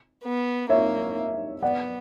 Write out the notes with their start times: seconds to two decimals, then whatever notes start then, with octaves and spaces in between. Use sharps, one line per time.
0.23 B3
0.69 A#3 C#5 E5
1.62 B3 D5 F#5